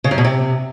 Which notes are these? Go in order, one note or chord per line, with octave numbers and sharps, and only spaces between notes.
C#3
F#2
B2
C3